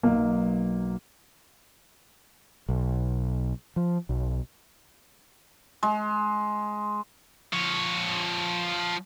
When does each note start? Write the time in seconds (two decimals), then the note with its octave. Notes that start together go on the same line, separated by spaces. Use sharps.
0.03 B1 A#3
2.69 B1
3.76 F3
4.09 B1
5.83 G#3
7.53 F3 C#5